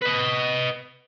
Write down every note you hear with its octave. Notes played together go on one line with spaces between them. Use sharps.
B4 D#5